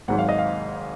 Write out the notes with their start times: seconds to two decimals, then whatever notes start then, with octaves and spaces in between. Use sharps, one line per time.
0.08 G#1 G#2 F#3 F#5
0.18 F5
0.29 D#5
0.38 F5